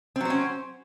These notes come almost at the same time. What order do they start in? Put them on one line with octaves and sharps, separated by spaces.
C4 F#3 C5 C#4